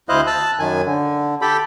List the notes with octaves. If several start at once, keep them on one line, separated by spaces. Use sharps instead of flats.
D2 E4 C5 D#5 F5 F#6
A5 E6 F#6
F#2 D#3 G#5
D3
G4 A4 G5 B5